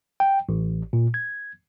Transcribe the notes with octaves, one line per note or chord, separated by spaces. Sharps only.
G5
A1
A#2
G#6